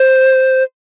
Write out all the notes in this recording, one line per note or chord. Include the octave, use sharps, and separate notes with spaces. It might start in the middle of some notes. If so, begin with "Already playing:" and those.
Already playing: C5